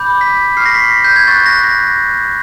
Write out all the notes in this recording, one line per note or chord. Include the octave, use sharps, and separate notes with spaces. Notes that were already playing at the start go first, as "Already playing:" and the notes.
Already playing: B5 D6 G6
B6
C#6 F6 C7
A#6
B6
G6
G#6
C#6 F#6 A6
A#6
A#6